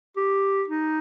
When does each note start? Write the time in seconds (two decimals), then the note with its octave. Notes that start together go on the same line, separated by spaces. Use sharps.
0.16 G4
0.68 D#4